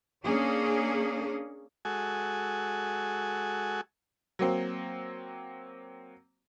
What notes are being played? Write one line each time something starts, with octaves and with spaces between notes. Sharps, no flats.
A#3 C#4 D4 G#4
G#3 F#4 A4 G#5
F#3 A#3 C4